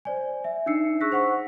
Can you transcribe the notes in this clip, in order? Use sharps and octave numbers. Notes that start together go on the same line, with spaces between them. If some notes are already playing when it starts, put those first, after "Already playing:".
C5 D5 G#5
E5
D4 D#4 E5 E6 C7 C#7
G#4 C#6 E6 F#6 A#6 B6
C5 F#5 C#6